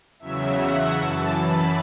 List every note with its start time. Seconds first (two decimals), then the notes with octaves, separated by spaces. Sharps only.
0.20 E2 C#3 F#3 E5
0.59 F#5
0.98 F#2 E3 A5
1.37 B5